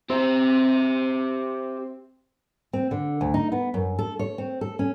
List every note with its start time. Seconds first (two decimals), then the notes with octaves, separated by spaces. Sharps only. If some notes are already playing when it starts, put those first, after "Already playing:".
0.10 C4 G4 E5
2.73 C4
2.91 D3
3.21 D2
3.34 D#4
3.52 B3
3.74 F#2
3.99 A4
4.19 C#5
4.38 C4
4.61 A4
4.79 C#4